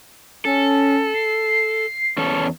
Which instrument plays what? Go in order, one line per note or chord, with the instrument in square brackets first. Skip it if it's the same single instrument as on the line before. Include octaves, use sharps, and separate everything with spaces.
[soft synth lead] C#4 [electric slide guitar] A4
[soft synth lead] C7
[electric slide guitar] E2 C#4 A4